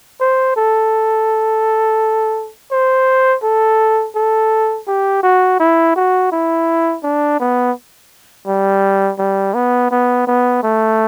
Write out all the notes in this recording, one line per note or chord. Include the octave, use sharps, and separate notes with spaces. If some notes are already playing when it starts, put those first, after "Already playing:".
C5
A4
C5
A4
A4
G4
F#4
E4
F#4
E4
D4
B3
G3
G3
B3
B3
B3
A3